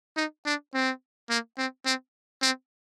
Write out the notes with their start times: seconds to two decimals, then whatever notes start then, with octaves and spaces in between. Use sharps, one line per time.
0.17 D#4
0.46 D4
0.74 C4
1.29 A#3
1.58 C4
1.86 C4
2.42 C4